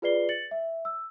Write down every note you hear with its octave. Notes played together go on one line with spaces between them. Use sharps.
F4 G#4 B4 D5 C7 G7
A6 C#7 F#7
E5
E6